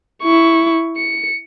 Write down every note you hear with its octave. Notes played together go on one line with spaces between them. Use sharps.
E4 C#6
C#7